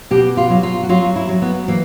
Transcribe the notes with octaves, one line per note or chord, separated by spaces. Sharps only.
B2 G4
F4
F#3
F4
F#4
F#3 F4
E4
F#3
B3
E3 A#3